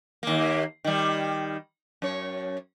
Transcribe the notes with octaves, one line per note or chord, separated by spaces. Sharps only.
D#2 A#3
D#3 G3
F#2 C#5